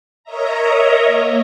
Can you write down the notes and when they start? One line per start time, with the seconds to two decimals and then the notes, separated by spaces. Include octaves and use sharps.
0.24 A#4 C#5 D#5 E5 A#5
1.04 A#3